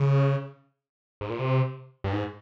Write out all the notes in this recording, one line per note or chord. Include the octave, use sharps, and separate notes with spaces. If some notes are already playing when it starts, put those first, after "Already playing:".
Already playing: C#3
G#2
A#2
C3
G2
G#2